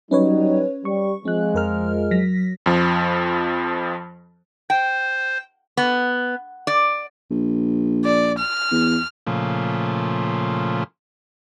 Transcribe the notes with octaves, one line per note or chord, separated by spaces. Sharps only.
F#3 G3 C#4 D#4 B4 C#5
G3 C#6
F3 G#3 C4 F#6
F2 A#4 F6
F#3 A#6 B6
F2 F3
C5 G5
B3
D5
A#1
D5
F6
E2
A#2 C#3 F3 A3